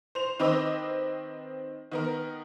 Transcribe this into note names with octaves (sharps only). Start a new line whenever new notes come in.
C5 F7
D#3 C4 B4 D#5 D6 E6
D#3 B3 A#4